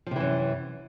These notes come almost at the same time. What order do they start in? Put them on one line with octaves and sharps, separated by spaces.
F3 C3 E3 F#2